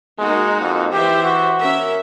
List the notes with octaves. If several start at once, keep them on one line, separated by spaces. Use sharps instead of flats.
G#3 A#3 D#4 F#4
F2
E3 G4 C5 E5
F#4
C#4 A#4 E5